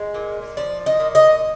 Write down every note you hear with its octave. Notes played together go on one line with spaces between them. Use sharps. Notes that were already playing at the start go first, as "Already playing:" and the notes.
Already playing: G#3
A#2
F3 D5
D#5
A#2
D#5